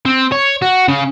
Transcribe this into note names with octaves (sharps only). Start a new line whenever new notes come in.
C4
C#5
F#4
C#3